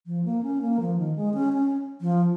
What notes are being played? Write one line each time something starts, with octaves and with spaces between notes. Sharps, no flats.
F3
A#3
C#4
A#3
F3
D#3
G#3
C#4
C#4
F3